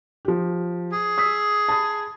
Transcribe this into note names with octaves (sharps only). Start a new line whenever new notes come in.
F3 G4
G#4
D#6 E6 B6
A5 B5 D#6